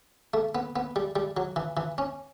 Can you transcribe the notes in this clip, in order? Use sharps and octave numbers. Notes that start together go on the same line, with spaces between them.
A3
B3
B3
G3
G3
F#3
E3
E3
C#4